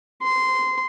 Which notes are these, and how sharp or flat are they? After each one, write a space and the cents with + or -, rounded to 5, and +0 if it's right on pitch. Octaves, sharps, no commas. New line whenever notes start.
C6 -15